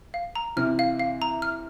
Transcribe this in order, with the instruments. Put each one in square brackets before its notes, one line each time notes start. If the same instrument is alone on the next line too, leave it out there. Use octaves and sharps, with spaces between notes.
[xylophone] F5
A#5
[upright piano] C3 E3 [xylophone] F6
[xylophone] F5
F5
A#5
F6